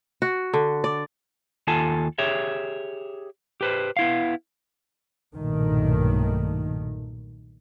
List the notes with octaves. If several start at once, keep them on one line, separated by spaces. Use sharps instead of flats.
F#4
D3
D5
D#2 F4 A4 G#5 A5
G4 G#4 C#5 E5
G4 B4 C5
B3 E4 F5
B1 G2 A#2 D#3 A3